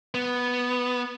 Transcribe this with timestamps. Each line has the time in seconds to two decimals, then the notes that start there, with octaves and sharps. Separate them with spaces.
0.15 B3